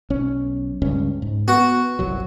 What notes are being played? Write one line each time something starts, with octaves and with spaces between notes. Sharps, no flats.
B1 C#4
C#2 G2 C#4
G#2
B3 F#4
G1 C2 F#3